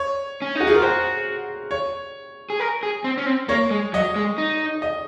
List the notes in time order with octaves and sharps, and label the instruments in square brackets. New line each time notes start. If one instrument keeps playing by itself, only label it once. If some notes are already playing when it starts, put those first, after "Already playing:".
Already playing: [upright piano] C#5
[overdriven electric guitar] C#4
[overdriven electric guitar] D#4 [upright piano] F#4
[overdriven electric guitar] F4 [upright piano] G#4
[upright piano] A#4
[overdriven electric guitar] F#4 [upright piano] C5
[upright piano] C#5
[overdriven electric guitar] G#4
A#4
G#4
C4
C#4
C4
[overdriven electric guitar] A#3 [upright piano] C#5
[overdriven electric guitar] G#3
[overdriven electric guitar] F#3 [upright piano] D#5
[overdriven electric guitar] G#3
D#4
[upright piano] D#5